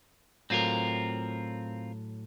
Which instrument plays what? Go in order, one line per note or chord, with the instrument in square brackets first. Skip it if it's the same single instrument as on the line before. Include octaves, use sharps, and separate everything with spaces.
[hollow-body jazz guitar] A2 F#3 [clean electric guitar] C4 F4 A#4